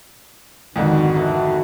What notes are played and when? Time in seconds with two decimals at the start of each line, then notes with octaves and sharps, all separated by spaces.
0.76 G#1 F2 G#2 D3 D#3 F#4 B4
1.16 E3 F#3 A3